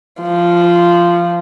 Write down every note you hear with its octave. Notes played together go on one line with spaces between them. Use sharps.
F3